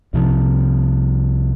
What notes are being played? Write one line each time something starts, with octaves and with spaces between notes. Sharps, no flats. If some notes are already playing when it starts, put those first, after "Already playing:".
C2 C3 F3